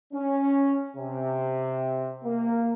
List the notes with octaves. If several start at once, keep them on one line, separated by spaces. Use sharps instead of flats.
C#4
C3
A#3